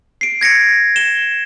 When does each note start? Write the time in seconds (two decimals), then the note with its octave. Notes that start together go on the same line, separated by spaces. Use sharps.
0.21 C7 D7
0.41 G#6 A#6 C#7 D7
0.96 E7 G7